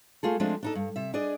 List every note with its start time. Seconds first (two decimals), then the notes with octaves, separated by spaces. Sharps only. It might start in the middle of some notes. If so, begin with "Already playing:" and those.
0.23 A3 F4 G#4 A4
0.40 F3 G#3 A3 C4 D4 F4
0.63 D4 D#4 A4
0.75 G2
0.96 C3 E5
1.14 D4 G#4 D5 D#5